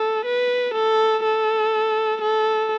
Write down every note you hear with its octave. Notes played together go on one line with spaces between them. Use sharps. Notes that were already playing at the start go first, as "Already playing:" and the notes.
Already playing: A4
B4
A4
A4
A4